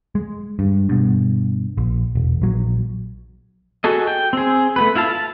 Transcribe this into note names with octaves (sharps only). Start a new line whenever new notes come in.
G#3
G2
G2 B2
A#1
E1
A#1 F#3
F#4 G#4 A4 D#5
G5
C4 G#4
A3 B3 B4
E4 F4 F5 A5
A5